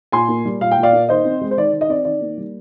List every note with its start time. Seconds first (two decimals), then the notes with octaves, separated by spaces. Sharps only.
0.12 A#2 G#5 C6
0.28 A#3
0.45 G3
0.61 A#2 F5
0.71 G5
0.78 A#2
0.83 D5 F5
0.93 A#3
1.09 D#3 C5 D#5
1.25 C4
1.41 G#3
1.51 C5
1.57 D#3 D5
1.73 D#3
1.81 D#5
1.89 C4 D5
2.05 D#3 D5
2.21 A#3
2.38 G3